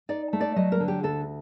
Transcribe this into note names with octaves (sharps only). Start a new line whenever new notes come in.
D#4 D5
A3
D5
F#3 D#5
A#4
D3
G4
D2 A4